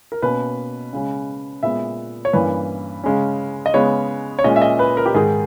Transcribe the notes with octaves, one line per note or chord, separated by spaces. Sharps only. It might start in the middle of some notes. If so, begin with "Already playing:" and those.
A#4
B2 A#3 C#4 B4
C#3 G#3 C#4
A#2 G#3 B3 E5
C#5
G2 E3 A#3 C#4 B4
C#3 G#3 C#4
D#5
C#3 G#3 B3 C#5
C#5
A#2 G#3 C#4 D#5
E5
D#5
B4
A#4
G4
G#2 D#3 G#3 G#4